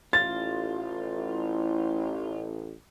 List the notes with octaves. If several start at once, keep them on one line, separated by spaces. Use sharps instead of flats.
A1 F4 A6
E4